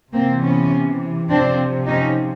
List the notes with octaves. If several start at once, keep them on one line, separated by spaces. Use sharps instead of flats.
C3 E3 A#3 C4
B3 C#4
C3 F3 C4 D4
C#4 D#4